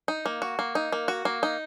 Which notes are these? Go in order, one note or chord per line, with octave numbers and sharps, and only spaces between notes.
D#4
A#3
F#4
A#3
D#4
A#3
F#4
A#3
D#4